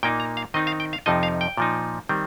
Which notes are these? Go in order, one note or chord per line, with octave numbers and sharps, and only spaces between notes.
A#2 A#3 D#4 G5
A#5
F5
D#3 C4 D#4 D#5
F5
G5
F5
F2 C3 F3 D#4 D#5
F5
G5
A#2 F3 D#4
D#3 G3 C4